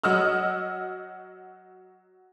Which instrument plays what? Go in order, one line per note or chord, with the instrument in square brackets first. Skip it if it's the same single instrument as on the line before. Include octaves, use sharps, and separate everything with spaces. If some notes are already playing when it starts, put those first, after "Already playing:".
[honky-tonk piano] F#3 F#4 D#5 E6 F6